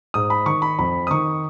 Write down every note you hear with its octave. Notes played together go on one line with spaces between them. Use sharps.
G#2 D#6
B5
D#3 C#6
B5
F2 B5
D#6
D#3 C#6